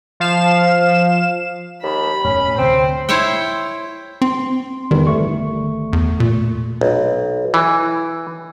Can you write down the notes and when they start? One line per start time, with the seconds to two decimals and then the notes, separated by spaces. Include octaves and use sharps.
0.20 F3 F5 E7
1.83 D#2 B5
2.24 E1 F#2 A2 C#4
2.59 D2 C3 C4 C5
3.09 E4 C5 C#5 E5 G5
4.22 C4 C6
4.91 E2 D#3 E3 G3
5.07 G1 A3 C#6
5.93 E2
6.20 A#2
6.81 B1
7.54 E3